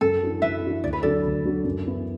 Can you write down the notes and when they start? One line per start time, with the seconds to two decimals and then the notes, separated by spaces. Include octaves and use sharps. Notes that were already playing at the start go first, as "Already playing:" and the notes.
0.01 F#2 A4
0.22 E3 D4 F#4
0.42 F#2 B4 E5
0.62 E3 D4 F#4
0.83 D2 D5
0.93 B4
1.03 D3 F#3 D4 F#4 A4 D5
1.24 D2
1.45 D3 F#3 D4 F#4
1.65 F#2
1.86 E3 B3 E4